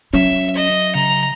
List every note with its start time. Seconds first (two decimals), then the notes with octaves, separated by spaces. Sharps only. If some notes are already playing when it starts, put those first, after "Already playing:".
0.13 F#3 C#4 E5
0.56 D#5
0.95 C#3 A#5